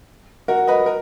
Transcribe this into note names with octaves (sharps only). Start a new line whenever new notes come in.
F#4 A#4
B4 D#5
A#4